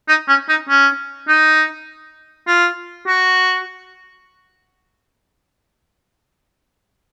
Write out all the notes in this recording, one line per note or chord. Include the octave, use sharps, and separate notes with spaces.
D#4
C#4
D#4
C#4
D#4
F4
F#4